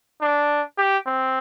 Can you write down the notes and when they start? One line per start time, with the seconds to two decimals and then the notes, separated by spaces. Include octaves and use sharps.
0.22 D4
0.78 G4
1.07 C4